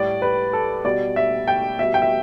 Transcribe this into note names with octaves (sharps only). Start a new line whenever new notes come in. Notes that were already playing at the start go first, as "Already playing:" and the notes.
Already playing: A2 G3 D5
B4
A4
B2 G3 D5
E5
G5
B2 G3 E5
G5
E5